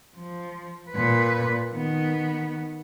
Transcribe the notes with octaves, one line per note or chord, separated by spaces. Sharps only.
F3
A#2 B4
D#3 B3